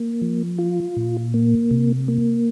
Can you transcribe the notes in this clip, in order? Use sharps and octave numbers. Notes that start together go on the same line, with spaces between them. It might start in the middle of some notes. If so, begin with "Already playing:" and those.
Already playing: A#3
F3
F4
A#2
A#3
C3
A#3